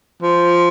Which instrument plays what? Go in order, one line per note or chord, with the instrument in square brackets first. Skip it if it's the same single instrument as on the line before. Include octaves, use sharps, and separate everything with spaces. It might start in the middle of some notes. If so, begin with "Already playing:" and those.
[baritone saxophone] F3